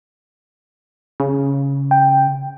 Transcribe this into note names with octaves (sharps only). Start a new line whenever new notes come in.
C#3
G5